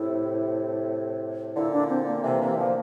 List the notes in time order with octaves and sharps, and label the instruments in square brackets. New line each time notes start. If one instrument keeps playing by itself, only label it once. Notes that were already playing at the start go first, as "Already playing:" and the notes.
Already playing: [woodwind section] A2 C3 [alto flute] E4
[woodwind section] A#2 D3 [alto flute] E4
[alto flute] D4
C4
A#3
[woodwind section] C3 E3
C3 E3
D3 F3